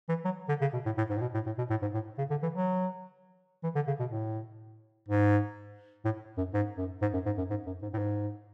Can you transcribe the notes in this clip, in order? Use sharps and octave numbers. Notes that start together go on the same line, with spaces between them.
E3
F#3
D3
C#3
B2
A2
A2
G#2
A2
B2
A2
A2
B2
A2
G#2
A2
C#3
D3
E3
F#3
E3
D3
C#3
B2
A2
G#2
A2
F#2
G#2
F#2
G#2
F#2
G#2
F#2
G#2
F#2
G#2
A2
G#2